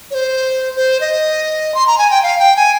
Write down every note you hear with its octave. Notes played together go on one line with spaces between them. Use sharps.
C#5
C5
C5
D#5
C6
A#5
G#5
G5
F5
G5
G#5